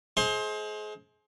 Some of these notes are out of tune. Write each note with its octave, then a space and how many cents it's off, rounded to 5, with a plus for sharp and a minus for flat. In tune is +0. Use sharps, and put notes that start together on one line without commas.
G#3 +35 C5 +20 C6 +25